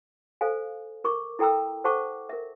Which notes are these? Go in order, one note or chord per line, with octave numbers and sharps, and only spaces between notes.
A4 C5 F5 G#5
A#4 C#6 D6
E4 A4 G5 A#5 E6
A4 C5 F#5 A5 C#6 D6
A#4 E5